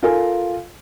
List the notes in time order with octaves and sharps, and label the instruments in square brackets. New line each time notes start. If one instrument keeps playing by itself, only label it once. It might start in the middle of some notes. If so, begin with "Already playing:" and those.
[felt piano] F4 A4 A#4 F5 G#5